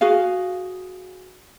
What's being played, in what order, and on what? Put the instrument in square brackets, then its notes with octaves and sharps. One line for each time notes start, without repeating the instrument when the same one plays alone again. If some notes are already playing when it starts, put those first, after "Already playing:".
[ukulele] F#4 G#4 F5